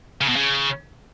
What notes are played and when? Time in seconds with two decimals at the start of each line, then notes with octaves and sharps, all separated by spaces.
0.21 C#3
0.29 B2
0.36 C#3